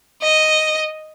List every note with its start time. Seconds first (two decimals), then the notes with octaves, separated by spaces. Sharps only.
0.22 D#5